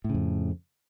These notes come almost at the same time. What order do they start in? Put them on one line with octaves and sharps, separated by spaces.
A2 C#3 F2